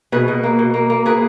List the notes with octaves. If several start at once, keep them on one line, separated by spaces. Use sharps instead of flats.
B2 G#4 B4
B2
A#3
B2
A#3
A#3
A#3 G#4 B4